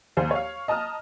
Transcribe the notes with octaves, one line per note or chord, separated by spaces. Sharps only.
D#2 C5 G#5
C#5 F5
D#5 A5 A#5 D#6 F6